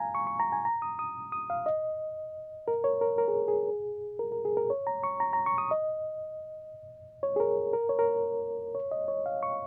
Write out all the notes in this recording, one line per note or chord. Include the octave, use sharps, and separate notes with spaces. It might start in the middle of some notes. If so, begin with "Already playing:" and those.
Already playing: F5 G#5 A#5
C#6
C#6
A#5
G#5
A#5
D#6
D#6
D#6
F5
D#5
A#4
C#5
A#4
A#4
G#4
G#4
A#4
A#4
G#4
A#4
C#5
A#5
C#6
A#5
A#5
C#6
D#6
D#5
C#5
G#4
A#4
A#4
C#5
A#4
C#5
D#5
C#5
F5
C#6